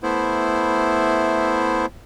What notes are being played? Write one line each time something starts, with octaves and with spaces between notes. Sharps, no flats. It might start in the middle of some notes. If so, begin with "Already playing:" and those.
A3 B3 E4 C5